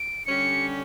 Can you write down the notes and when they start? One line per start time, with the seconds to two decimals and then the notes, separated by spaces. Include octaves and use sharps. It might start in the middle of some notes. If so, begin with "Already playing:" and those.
Already playing: D7
0.26 D3 G3 C#4 G4 C#7